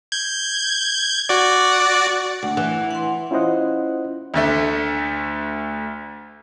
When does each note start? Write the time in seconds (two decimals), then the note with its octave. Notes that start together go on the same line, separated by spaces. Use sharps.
0.12 G6 G#6
1.29 F#4 D5
2.43 D2 F#5
2.57 E3
2.91 F#5 C6
3.31 C#4 E4 F4 C5 D#5 F#5
4.34 D2 D3 A3